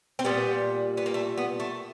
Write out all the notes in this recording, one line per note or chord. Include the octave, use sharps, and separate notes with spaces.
C4
A#2 G3 B3
B3
A#3
A3
B3
A3